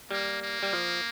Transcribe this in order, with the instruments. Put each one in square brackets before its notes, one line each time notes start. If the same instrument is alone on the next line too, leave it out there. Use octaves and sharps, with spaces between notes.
[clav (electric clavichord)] G3 [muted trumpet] A#3
[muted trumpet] A#3
[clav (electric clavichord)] G3
F3